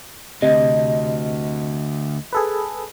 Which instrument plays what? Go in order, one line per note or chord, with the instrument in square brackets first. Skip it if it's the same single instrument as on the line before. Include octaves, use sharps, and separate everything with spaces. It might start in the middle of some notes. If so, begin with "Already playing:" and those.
[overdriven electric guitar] D2 [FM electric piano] C3 [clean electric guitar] D#5
[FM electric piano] G#4 A4 B4